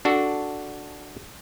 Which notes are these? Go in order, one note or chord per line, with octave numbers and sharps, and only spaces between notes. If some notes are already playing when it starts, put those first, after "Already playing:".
D4 F#4 A4